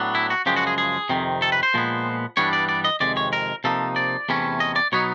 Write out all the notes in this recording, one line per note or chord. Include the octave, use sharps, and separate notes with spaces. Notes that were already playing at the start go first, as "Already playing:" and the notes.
Already playing: A2 F#3 B3 D4
E4
F#4
F#2 C#3 F3 G#3 G4
F#4
G#4
G#4
F2 C3 D#3
A4
B4
C5
A#2 F3 G#3 B3
G2 E3 G3 B3 D4 C#5
D5
D5
D#5
F2 C3 D#3 G#3 D5
C#5
A#4
C3 F3 A#3 D#4 A4
D5
E2 C3 E3 A3 C#4
D#5
D5
B2 F#3 B3 D#4 C#5